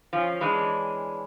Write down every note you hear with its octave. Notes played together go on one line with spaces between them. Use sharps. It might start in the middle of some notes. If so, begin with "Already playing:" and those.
F3 C#4
E3 G#3 C#4 D4